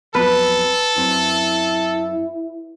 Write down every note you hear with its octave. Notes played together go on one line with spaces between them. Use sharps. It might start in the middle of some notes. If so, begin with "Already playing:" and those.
F2 F#3 B3 A4 B4
F#2 C4 E4